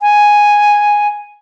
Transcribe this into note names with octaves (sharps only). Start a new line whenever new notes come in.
G#5